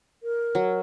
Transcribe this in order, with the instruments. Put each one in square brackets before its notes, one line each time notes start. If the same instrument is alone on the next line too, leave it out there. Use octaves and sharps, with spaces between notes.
[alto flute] A#4
[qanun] F#3